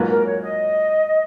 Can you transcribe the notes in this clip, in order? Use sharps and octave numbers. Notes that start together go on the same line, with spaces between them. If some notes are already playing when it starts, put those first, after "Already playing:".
Already playing: G#2 F#3 A#3 F4 B4
A#4
C#5
D#5